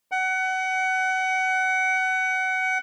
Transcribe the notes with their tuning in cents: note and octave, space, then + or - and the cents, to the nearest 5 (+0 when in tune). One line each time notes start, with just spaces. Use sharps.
F#5 +25